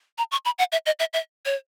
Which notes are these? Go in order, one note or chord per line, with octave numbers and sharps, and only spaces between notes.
A#5
C#6
B5
F#5
E5
D#5
E5
E5
C#5